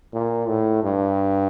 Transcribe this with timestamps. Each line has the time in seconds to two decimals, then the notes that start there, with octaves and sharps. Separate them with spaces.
0.13 A#2
0.48 A2
0.83 G2